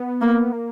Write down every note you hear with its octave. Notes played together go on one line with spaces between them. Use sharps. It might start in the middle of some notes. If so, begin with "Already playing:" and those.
Already playing: B3
A#3
A#3